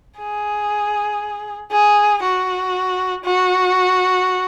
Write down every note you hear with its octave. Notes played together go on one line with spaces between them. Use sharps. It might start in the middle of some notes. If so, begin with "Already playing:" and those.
G#4
G#4
F#4
F#4